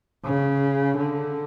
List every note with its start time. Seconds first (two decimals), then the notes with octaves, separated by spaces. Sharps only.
0.24 C#3
0.97 D3